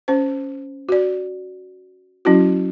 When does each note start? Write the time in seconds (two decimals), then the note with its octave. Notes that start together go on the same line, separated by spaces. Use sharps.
0.08 C#4 C5
0.89 F#4 D5
2.25 F#3 C#4 E4 F#4